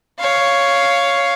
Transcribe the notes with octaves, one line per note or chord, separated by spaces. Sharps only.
C#5 F5